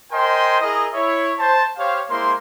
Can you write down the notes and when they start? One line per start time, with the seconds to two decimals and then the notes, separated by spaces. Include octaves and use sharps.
0.12 A#4 C5 D#5 G5 G#5 C6
0.61 E4 G#4 A#4 D#5
0.94 E4 C#5 E5
1.39 C5 A5
1.77 G4 C5 C#5 F5
2.10 G#3 A#3 E4 C5 C6